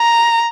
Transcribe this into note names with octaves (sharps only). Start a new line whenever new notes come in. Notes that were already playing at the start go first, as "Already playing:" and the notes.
Already playing: A#5